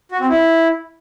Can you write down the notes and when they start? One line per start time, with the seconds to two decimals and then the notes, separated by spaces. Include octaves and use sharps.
0.12 F#4
0.20 C4
0.29 E4